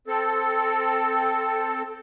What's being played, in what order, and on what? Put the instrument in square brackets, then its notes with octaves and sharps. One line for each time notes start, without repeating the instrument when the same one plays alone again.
[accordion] C4 A4